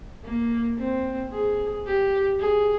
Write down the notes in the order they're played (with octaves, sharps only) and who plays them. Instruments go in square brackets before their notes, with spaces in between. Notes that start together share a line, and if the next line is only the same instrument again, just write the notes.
[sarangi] A#3
C4
G#4
G4
G#4